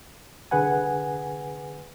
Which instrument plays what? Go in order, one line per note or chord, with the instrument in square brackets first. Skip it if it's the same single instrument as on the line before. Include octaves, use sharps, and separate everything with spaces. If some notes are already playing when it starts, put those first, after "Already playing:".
[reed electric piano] C2 D3 G#4 B4 F#5 G#5